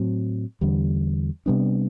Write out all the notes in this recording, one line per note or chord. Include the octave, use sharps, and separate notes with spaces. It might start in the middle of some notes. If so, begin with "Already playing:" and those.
Already playing: A2 F#3 C4
E2 D3 G3
C3 G3 B3 D4